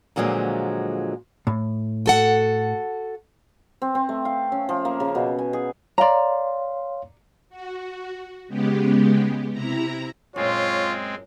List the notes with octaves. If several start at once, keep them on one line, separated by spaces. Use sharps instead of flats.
A#2 D3 F3 F#3 G#3 A#3
A2
F#4 A4 F#5
C4
C4
A3
F5
C#4
F3
A#3
C#3
B2
G#5
G#4
C#5 D5 F5 A#5 C6
F#4
C#3 G#3 B3 G4
C3 E4 A#5
F#2 A#2 G#3 C4 F4 C#5